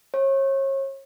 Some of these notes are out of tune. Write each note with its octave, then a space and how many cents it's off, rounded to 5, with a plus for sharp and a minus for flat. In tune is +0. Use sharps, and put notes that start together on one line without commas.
C#5 -35